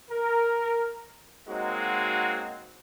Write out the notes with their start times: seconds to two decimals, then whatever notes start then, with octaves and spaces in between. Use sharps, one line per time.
0.10 A#4
1.47 F#3 G#3 A#3 C4 D#4 F#4